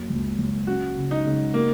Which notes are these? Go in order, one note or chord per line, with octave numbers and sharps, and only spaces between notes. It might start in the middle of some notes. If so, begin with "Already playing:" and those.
Already playing: F#2 A#3
C#2
C#2
C#4 F#4
C#3
D#4
C#3
A#3 F#4